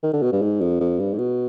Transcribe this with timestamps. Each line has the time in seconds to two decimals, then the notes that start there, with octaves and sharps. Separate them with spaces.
0.03 D#3
0.13 D3
0.22 B2
0.32 G2
0.42 G#2
0.61 F2
0.80 F2
0.99 G2
1.14 G#2
1.18 B2